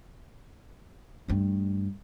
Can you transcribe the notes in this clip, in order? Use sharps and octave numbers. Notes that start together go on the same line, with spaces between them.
G2 A3